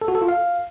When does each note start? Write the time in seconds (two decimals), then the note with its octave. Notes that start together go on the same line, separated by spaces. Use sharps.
0.02 A4
0.08 F#4
0.15 A4
0.22 F4
0.28 F5